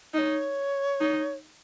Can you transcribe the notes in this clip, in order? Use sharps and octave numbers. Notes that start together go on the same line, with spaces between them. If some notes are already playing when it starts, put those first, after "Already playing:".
D#4 C#5 D#5
D#4